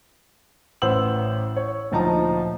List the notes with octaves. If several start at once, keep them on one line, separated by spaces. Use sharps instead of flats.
A1 B4 C5 F#5 E6 F#7
C#5
D2 A#2 F3 D#4 A5 A#5